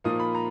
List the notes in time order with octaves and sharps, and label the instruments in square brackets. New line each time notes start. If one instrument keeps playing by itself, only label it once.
[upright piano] A#2 F3 A#3 D#4 D#6
B5
A#5